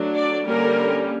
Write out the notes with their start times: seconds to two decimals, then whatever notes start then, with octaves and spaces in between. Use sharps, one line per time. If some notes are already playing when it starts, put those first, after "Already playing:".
Already playing: F#3 A3 D4
0.15 D5
0.47 D3 G3 A#3 C#4 A#4